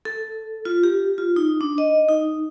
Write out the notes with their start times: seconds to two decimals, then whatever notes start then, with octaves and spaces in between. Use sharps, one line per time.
0.05 A4
0.65 F4
0.83 G4
1.18 F4
1.36 D#4
1.61 D4
1.78 D#5
2.08 D#4